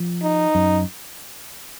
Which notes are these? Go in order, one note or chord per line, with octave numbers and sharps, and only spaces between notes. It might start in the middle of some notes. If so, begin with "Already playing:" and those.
Already playing: F3
D#4
F#2